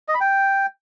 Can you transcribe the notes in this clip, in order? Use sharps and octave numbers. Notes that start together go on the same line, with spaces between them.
D#5
B5
G5